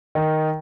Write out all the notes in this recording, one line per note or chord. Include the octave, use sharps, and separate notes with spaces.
D#3